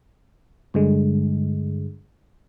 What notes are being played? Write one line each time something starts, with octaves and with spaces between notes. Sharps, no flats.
G2 D3 G#3